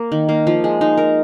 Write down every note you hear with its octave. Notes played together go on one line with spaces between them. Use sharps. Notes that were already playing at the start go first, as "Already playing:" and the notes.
Already playing: A#3 A#4
D#3
A#3
F3
G#3
D#4
A#4